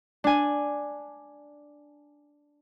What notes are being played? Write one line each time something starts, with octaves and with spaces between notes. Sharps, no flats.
D4 G#5